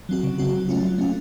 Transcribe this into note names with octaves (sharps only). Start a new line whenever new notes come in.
F#3 C4 F#4
C#3
F#3 C4 F#4
F#3
A3 C#4 F4
F#3
A3 C#4 F4